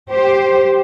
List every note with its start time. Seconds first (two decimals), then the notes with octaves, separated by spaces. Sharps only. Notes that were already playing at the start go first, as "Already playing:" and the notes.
0.10 G4 C5